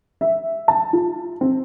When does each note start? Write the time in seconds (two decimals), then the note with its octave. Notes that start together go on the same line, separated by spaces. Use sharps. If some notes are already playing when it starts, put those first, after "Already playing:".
0.21 E5
0.68 A5
0.93 F4
1.41 C4